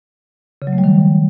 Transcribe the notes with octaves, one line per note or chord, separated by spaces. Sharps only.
C#3
F#3
A3
G3
D#3